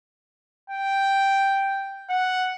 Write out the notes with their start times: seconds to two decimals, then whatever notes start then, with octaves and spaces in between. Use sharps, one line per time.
0.70 G5
2.10 F#5